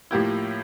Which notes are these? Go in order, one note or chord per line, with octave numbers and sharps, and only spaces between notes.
A2 F3 A#3 E4 G4